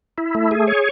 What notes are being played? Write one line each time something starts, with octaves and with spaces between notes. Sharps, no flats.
E4
A3
G#4
C#5